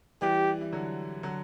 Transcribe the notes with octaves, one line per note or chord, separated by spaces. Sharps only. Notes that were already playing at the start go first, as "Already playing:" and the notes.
E3 G3 G4
E3
D3 F#3
D3 F#3